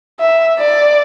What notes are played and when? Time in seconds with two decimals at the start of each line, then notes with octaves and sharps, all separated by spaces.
0.20 E5
0.59 D5